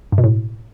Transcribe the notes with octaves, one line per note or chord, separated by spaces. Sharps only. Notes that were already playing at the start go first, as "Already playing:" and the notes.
G2
B2
A2